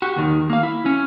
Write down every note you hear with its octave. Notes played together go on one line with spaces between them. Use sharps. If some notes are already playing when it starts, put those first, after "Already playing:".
F#4 G4
D#2 D#3
A#3 F5
E4
C#4